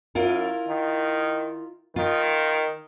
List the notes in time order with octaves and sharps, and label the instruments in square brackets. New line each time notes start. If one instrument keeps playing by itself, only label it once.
[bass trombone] F#2 [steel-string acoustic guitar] E4 F4 A#4
[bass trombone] D#3
[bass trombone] D#3 [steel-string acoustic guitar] F4